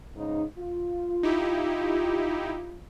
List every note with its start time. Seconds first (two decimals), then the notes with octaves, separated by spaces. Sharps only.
0.16 G#2 C#3 D#4
0.58 F4
1.23 D#4 E4 G4